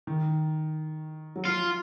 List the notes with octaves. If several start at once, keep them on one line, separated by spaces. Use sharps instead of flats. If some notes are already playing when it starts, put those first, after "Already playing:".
D#3
F#3
F3 F4